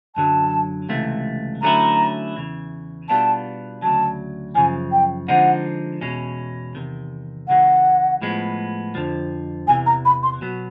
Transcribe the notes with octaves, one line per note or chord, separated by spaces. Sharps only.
F#2 D3 F#3 A5
C#2 C3 E3 A3
D3 F#3 A3 C#4 E4 A#5
E2 C#3 E3
B2 G3 B3 D4 F4 A5
D2 C#3 F#3 A5
F#2 C#3 F3 G#5
G5
D3 F3 G#3 C4 D#4 F#5
E2 B2 G#3 C#4
E2 C3 D#3
C#2 C#3 E3 G#3 F#5
A2 F3 G#3 B3
F2 D3 F3
E2 C3 E3 G#5
A#5
B5
C6
B2 F#3 B3